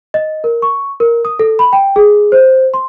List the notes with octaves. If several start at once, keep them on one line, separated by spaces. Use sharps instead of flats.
D#5
A#4
C#6
A#4
D#6
A4
B5
G5
G#4
C5
C6